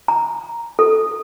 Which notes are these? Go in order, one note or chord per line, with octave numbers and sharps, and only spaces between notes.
A#5
A4